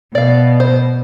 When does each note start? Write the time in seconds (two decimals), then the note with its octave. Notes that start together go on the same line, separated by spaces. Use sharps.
0.15 B2 D5 F5
0.60 C5